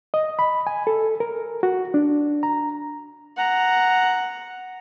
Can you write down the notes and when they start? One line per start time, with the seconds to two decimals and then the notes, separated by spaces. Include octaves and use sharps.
0.14 D#5
0.39 B5
0.67 G#5
0.87 A4
1.20 A#4
1.63 F#4
1.94 D4
2.43 A#5
3.37 F#5 A#5